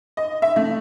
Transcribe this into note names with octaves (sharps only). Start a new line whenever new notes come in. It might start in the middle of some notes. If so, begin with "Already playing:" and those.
D#5
E5
A3